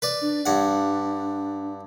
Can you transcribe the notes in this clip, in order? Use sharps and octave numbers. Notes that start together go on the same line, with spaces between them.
B4 D5
D4
G2 D4 F#5